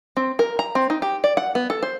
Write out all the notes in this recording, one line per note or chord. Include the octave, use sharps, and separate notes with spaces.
C4
A#4
A#5
C4
D#4
G4
D5
F#5
B3
A4
C5